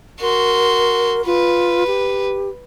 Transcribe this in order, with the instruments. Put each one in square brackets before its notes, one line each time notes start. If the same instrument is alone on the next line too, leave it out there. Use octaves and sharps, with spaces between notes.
[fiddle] F#4 C6 [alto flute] A#4
[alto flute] F4 [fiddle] B4
[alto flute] G4